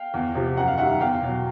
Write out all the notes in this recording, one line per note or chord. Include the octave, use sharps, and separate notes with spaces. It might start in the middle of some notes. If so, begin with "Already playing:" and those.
Already playing: F5 G5
E2
C3 F3
F#2 F#5
F5
D#3 G3 E5 F#5
E2 F5 G5
B2 F#3